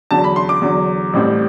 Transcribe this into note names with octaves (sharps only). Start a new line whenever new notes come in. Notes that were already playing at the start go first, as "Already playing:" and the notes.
E2 D3 F#3 A5
B5
C6
D6
E2 D3 F#3
A1 A2 G3 C4